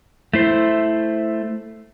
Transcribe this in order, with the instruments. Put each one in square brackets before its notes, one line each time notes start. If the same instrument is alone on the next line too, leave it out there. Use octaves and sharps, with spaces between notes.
[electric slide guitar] A3 E4 C5